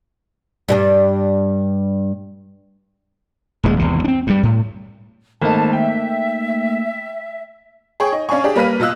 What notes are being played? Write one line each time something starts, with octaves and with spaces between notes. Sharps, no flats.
G2 G3 D4
D#1 D#2 D3 G#3
G#1 E2 C3
C4 D4
G2 G3
A2
G#1 A3 A#3 D#4 A5
E5 G5
G#4 C#5 G5 C#6
D#4
C#4 D4 F5 G#5 C#6
D4 G4 G#4
G3 A#3 B4 F6 B6 D#7
B2 F4 D#5 E6 F#6